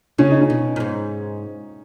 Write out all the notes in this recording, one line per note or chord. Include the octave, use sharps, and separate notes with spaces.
C#3 C#4
D#4
C#4
B2
A#2
G#2